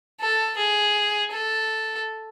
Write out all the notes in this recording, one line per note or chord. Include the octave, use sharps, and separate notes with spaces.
A4
G#4
A4